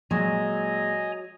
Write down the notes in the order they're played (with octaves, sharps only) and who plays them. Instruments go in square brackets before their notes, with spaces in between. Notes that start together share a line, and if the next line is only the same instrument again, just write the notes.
[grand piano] A#2 G#3 [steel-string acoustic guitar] F#3 [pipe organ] D#5 G#5 A#5